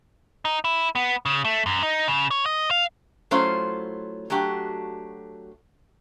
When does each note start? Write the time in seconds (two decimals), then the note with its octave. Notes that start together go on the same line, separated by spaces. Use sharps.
0.45 D#4
0.64 E4
0.95 B3
1.26 C#3
1.45 A3
1.66 F#2
1.83 D#4
2.08 C#3
2.31 C#5
2.46 D#5
2.71 F5
3.31 F#3 A3 C#4 E4 F4 C5
4.30 F#3 A3 D4 F#4 G4